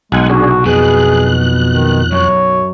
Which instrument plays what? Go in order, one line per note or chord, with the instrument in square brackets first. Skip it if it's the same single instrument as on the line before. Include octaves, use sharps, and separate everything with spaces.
[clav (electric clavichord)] B1 [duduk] G#3 [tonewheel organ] F#5 G#5
[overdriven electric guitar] C2 [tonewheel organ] D4 G#4 [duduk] F#4
[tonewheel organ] F2 F#6 [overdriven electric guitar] B2 [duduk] G#4
[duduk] D#3
[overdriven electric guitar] F#2 [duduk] C#5